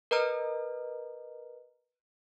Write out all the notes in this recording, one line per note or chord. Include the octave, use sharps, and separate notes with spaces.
A#4 B4 D#5 A#5 F6